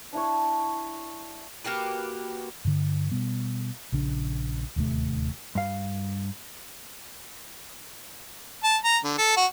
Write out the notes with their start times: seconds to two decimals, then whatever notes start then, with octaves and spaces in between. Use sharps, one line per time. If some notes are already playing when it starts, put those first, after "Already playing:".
0.13 D4 E4 C#5
1.64 A#3 F#4 G4 B4
2.65 G2 D3
3.12 B2 G3 B3
3.92 A#1 C#3 D4
4.76 D1 D#2 C3 A3
5.55 G2 F5
8.64 A5
8.84 A#5
9.04 D3
9.18 A4
9.37 F#4